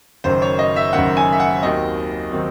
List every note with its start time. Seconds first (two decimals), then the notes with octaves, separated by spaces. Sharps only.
0.24 F#1 F#2 D#3 C5
0.42 C#5
0.59 D#5
0.76 E5
0.93 F#1 F#2 D#3 F#5
1.17 G#5
1.32 E5
1.40 F#5
1.63 D#2 D#3 F#3 C4 D#5
2.32 D#3 F#3 C4